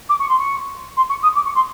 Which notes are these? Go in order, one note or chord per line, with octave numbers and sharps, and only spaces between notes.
D6
C#6
C6
C#6
C6
C#6
D#6
D6
C#6
C6